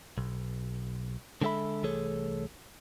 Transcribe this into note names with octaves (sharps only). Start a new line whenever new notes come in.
B1
D3 G#3 B3 A4 E5 B5
C2 E3 A3 G#4 A4 C#5